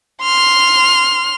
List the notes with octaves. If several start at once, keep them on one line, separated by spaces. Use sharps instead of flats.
C6 F6